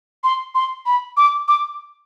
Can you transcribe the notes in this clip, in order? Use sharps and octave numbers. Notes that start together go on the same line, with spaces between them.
C6
C6
B5
D6
D6